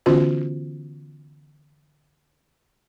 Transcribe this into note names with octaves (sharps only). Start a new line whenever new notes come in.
D3 E3 B3 C#4 F4 F#4